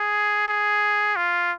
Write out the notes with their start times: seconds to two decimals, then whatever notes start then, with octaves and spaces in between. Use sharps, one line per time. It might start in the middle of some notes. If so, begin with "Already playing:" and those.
Already playing: G#4
0.48 G#4
1.16 F4